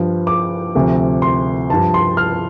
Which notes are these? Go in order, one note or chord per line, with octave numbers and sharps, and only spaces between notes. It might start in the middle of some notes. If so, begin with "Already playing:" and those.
Already playing: G2 F3
D6
D2 C3 F3
C6
G2 F3 A5
C6
F6